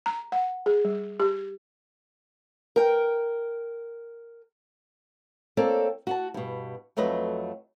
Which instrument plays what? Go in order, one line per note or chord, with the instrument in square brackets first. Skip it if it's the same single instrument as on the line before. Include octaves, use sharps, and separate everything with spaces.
[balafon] A#5
F#5
G#4
G3
G4
[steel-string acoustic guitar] A#4 G5
[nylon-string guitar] A#3 C4 A4 C#5 D5
F#4 F#5 A5
G2 B2
F2 F#3 A3 B4 D#5